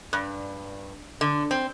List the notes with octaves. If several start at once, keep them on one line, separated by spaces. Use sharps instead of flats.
G2
D3
C4